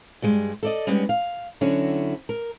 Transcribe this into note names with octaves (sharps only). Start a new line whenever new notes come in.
G2 G3 G#3
A4 D5 D#5
G3 G#3 B3 C#4 D#4 G4
F5
D3 F#3 C#4 E4 F#4
A#4